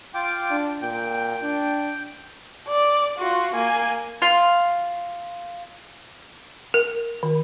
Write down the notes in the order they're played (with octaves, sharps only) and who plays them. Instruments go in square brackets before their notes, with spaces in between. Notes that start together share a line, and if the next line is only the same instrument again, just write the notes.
[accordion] F4 G5 D6
[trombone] D4
[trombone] A#2 [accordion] G5
[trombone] D4
[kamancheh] D5
F4 F#4
A#3 G#5
[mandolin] F4
[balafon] A#4
D#3